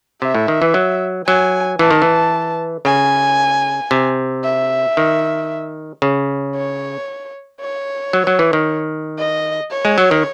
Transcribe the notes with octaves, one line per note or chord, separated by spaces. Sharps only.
C3 E5
A2
D#3
E3
F#3
F#3 G#5
E3 A5
D#3
E3
C#3 G#5
C3
E5
D#3
C#3
C#5
C#5
F#3
F#3
E3
D#3
D#5
C#5
G#3
F#3
D#3